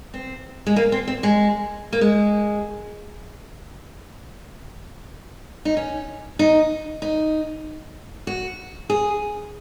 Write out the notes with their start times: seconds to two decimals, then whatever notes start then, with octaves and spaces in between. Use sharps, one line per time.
0.14 C4
0.67 G#3
0.76 A#3
0.92 C4
1.08 C4
1.23 G#3
1.93 A#3
2.01 G#3
5.65 D#4
5.77 C#4
6.39 D#4
7.02 D#4
8.27 F#4
8.90 G#4